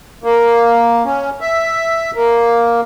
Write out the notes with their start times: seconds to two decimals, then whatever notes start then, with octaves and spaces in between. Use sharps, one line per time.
0.24 A#3
1.05 C#4
1.40 E5
2.15 A#3